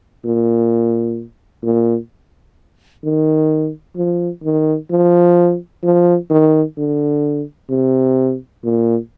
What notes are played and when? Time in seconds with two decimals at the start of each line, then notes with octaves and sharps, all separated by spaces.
0.25 A#2
1.63 A#2
3.04 D#3
3.97 F3
4.43 D#3
4.90 F3
5.83 F3
6.30 D#3
6.77 D3
7.70 C3
8.64 A#2